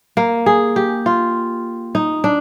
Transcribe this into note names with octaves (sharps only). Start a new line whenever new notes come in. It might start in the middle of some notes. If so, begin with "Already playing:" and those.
A#3
G#4
G4
F4
D#4
D4